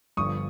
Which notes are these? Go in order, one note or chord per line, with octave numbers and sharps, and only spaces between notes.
G1 G2 D3 F3 C#6 D#6